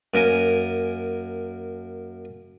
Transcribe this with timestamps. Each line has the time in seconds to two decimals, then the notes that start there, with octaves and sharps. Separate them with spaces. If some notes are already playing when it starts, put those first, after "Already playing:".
0.14 F#2 A#3 A#4 G#5